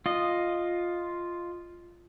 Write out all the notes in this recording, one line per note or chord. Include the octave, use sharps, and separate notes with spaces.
F4 D#5